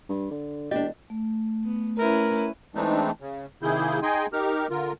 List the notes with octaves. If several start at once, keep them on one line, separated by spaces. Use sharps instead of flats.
G2
D3
E1 D4 G4 D#5
A3
B3
C#4 E4 A#4 B4
E3 G#3 A3 C4 D4 D#4
C#3
C3 D#3 A#3 E4 G#4 G6
D#4 G#4 D#5 G5 G#5 C6
D#4 G4 A#4 F6
D3 F4 A#4